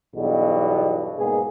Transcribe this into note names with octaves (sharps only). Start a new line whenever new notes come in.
B1 E2 G2 B2
G#2 B2 A#3 G#4